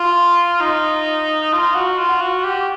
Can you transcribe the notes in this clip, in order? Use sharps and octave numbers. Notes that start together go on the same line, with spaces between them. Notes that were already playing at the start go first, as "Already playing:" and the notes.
Already playing: F4
D#4
F4
F#4
F4
F#4
G4